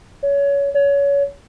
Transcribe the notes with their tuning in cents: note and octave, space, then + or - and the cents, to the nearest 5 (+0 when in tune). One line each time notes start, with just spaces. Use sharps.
C#5 +25
C#5 +25